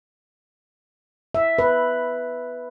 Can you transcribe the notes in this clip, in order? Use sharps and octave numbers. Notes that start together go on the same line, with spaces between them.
E5
B4